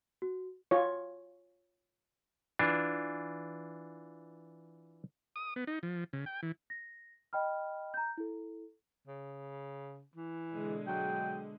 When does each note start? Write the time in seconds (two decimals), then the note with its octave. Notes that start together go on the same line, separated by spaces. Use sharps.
0.22 F#4
0.71 F4 C#5
2.59 E3 D4 F4
5.36 D#6
5.56 B3
5.67 D#4
5.83 F3
6.13 C#3
6.26 G5
6.43 E3
6.70 A#6
7.33 D#5 G5 B5 F6
7.94 A#5 G6
8.18 E4 A4
9.08 C#3
10.16 E3
10.51 B2 D3 G#3
10.87 F#3 G5